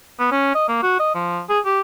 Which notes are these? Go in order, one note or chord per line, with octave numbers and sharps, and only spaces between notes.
B3
C#4
D#5
A#3
F#4
D#5
F3
G#4
G4